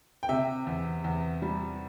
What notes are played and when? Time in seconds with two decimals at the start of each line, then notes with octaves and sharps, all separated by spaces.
0.23 G5
0.29 C3 E5
0.67 E2
1.04 E2
1.42 G3